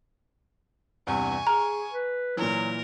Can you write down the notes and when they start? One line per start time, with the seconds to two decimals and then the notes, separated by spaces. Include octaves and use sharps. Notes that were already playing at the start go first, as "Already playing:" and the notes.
1.07 E2 G2 C3 G#5 C#6
1.47 G#4 A#5 F6
1.92 B4
2.37 A#2 E3 F#3 A#4